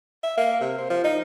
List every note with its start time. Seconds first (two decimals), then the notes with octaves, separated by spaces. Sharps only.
0.23 E5
0.37 A#3
0.60 C3
0.78 C5
0.90 F3
1.04 D#4